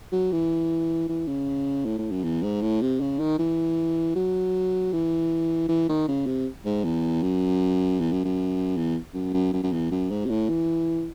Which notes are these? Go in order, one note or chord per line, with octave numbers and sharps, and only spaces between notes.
F#3
E3
E3
C#3
A2
A2
F#2
E2
G#2
A2
C3
C#3
D#3
E3
F#3
E3
E3
D#3
C#3
C3
G#2
E2
F#2
E2
F#2
F#2
E2
F#2
F#2
F#2
F#2
E2
F#2
G#2
C3
A2
E3